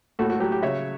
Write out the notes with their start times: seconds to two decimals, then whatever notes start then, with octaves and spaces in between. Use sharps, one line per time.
0.19 A2 F#4 A4
0.29 F#4 A4
0.40 F#3 G4
0.52 G4
0.62 C#3 C#5 E5